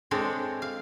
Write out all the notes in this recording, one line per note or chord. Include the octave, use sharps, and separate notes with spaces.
G#3 C4 D4 A4 C#5
F5